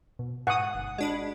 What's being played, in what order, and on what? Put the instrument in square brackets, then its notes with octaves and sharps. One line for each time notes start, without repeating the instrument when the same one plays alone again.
[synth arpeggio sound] B2
[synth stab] G#2 [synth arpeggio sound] B4 G#5 C#6 [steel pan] F#5 D#6
[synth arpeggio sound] G1
[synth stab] G#3 D4 B5 [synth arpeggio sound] F#4